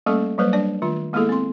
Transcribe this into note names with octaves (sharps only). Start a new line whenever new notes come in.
G3 A3 A#3 C#4 A4 C#6
F#3 G3 A#3 B4 C5
G3 D4 D5
D#3 A3 F4
G#3 A#3 B3 E4 G#4 A4
C4 C6